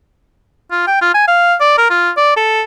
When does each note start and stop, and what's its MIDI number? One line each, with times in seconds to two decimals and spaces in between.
0.71 0.86 65
0.87 0.97 79
1.01 1.13 65
1.14 1.25 80
1.28 1.55 77
1.60 1.73 74
1.78 1.88 70
1.90 2.10 65
2.17 2.34 74
2.37 2.62 69